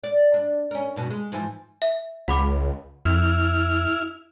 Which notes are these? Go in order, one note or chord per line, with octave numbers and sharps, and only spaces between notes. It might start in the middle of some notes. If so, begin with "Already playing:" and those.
D5
D4
C#4 A#4
G2 B2 B3
G#3
G#2 E3 F3
E5
C#2 F#5 B5 D6
F2 E4 F6